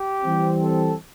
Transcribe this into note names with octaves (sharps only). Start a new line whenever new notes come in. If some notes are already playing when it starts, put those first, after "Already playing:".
Already playing: G4
E3 G3 C4
A4